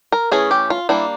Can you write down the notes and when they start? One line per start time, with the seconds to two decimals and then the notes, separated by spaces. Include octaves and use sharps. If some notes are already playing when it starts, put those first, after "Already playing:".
0.12 A#4
0.31 E3 A3 C#4 G#4
0.51 G4
0.70 F4
0.89 G3 A#3 D4 E4